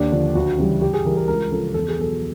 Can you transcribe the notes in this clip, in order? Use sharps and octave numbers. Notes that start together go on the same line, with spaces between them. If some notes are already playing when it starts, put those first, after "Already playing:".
Already playing: D#2 D4
D3 F3
D2 F#4
C#3 E3 G3
G2 G4
G#4
E3 G3 A#4
A#4
C#2 A#4
C#3 F3 A4
E2 A4
G#4
B2 F#3 A4